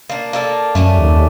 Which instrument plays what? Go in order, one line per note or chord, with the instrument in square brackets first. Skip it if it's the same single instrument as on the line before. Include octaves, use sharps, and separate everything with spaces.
[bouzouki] A#3 D4
A#3 D4 A4
[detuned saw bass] F#2 [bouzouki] A3 C#4 D4
[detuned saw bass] D#2